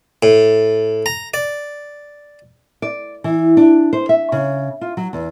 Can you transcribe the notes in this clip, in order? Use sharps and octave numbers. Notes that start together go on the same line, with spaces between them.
A2
A#5
D5
D5
E3
D4
C5
E5
C#3
F4
F#3
E2